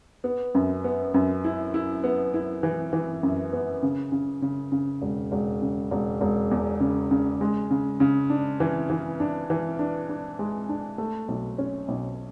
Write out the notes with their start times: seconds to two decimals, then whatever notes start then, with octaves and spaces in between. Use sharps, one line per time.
0.24 B3
0.55 F#2
0.84 B3
1.14 F#2
1.44 E4
1.74 E4
2.04 B3
2.34 E4
2.63 E3
2.93 E3
3.23 F#2
3.53 B3
3.83 C#3
4.12 C#3
4.42 C#3
4.72 C#3
5.02 E1
5.32 E1
5.62 C#3
5.91 E1
6.21 E1
6.51 E2
6.80 C#3
7.11 C#3
7.41 G#3
7.71 C#3
8.00 C#3
8.30 D4
8.60 E3
8.90 E3
9.20 D4
9.50 E3
9.79 D4
10.09 D4
10.39 G#3
10.69 D4
10.98 A3
11.28 B1
11.58 C#4
11.88 B1